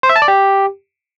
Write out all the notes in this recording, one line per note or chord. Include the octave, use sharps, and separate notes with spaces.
C5
E5
A5
D5
G4